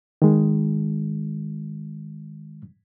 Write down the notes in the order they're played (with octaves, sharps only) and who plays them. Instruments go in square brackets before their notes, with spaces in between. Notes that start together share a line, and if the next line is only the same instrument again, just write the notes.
[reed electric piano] D#3 G#3